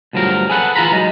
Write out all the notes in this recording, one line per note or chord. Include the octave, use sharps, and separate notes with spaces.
D2 G2 F3 F#3 A#4
G#4 A4 B4 F#5
E3 F4 B4 A#5 B5
F#3 G#3 D#4